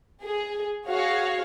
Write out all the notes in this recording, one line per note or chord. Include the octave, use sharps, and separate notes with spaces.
G#4
F#4 G#4 C#5 F5